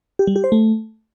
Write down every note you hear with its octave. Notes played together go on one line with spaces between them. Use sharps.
G4
G3
G4
C5
A3